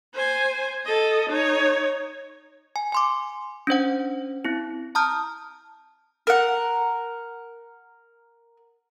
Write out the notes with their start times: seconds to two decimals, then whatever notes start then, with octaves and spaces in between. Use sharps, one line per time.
0.14 C5 G#5
0.85 A4 D#5
1.30 D#4 C#5
2.76 G#5
2.92 G#5 C6 D6
3.67 C#4 D4 C5 F#5
4.45 C4 E4
4.95 A5 A#5 D#6 F6 G6
6.27 A#4 F#5